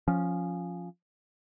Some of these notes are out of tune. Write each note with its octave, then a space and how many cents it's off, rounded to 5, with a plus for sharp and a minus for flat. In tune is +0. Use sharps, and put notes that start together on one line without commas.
F3 +10 C#4 +0